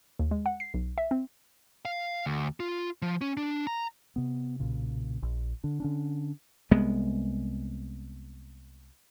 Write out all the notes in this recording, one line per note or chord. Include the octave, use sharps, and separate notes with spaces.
D#2
G#3
F#5
C7
B1
E5
C4
F5
D2
F4
F3
C#4
D4
A#5
C3 B3
B1 A#2 C#3
A#1
D3 D4
D3 C#4 D4
C2 G#3 B3